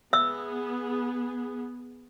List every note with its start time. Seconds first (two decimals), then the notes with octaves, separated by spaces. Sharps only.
0.13 B3 G#4 E5 E6